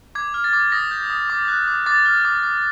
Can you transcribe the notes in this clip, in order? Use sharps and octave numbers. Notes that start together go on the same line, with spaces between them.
D6 G#6
F6
A6
D6
D#6 A#6
G6
D#6
D6
F#6
D6
D6 A6
F6
D6
D6